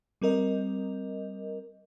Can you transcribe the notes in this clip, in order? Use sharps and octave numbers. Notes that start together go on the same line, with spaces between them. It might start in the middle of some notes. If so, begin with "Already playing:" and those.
G3 C4 A#4 D#5